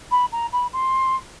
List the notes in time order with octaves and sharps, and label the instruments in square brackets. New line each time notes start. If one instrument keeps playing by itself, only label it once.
[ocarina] B5
A#5
B5
C6